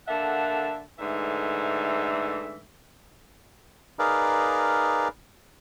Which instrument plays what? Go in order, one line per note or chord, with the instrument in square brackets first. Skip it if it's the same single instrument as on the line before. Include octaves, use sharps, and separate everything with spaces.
[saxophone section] D3 A#3 A4 E5 F#5
G#2 D3 E3 A3 E5
[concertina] D#4 G#4 A#4 B4 D5 F5